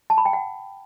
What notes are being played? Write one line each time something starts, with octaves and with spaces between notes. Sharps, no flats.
A5
B5
G5
F#5